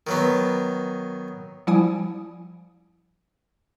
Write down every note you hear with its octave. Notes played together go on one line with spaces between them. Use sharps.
D#3 F#3 B3
F3 G3 E4 G#5 D#6 D7